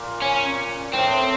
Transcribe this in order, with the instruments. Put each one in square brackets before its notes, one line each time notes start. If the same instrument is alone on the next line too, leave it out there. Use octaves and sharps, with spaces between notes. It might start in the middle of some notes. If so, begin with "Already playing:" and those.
Already playing: [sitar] A#2
[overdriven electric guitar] C#4
[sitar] A2 [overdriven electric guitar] C4